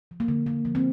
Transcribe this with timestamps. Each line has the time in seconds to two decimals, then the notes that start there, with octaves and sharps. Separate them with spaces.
0.11 F3
0.20 A#3
0.28 D3
0.46 A#3
0.65 F3
0.75 C4